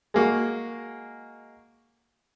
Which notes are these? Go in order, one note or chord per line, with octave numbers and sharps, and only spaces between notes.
G#3 A#3 F#4